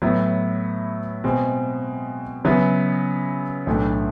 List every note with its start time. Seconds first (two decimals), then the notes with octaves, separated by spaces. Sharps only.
0.02 A2 F#3 B3 E4
1.24 B2 G#3 C4
2.45 C#3 F#3 B3 E4
3.67 B1 A2 E3 A3 D4